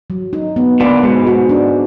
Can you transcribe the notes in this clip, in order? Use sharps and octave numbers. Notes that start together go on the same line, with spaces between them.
F#3
D#4
B3
A#2 D3 B4
G#2 B2 G#3
G#2 F#4
D4